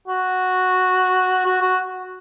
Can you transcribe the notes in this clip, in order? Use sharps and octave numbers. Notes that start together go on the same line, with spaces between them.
F#4
F#4
F#4